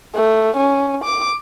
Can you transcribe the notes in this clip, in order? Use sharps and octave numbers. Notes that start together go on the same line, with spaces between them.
A3
C#4
D6